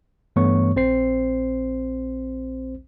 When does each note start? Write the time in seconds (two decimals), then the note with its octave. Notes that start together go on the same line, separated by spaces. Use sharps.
0.36 G2 E3 A3 B3 C#5 C#6
0.76 A#1 C4 C5 C7